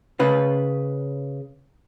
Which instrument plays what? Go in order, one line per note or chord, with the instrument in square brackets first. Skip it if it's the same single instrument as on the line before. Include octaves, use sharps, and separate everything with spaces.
[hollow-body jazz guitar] C#3 B4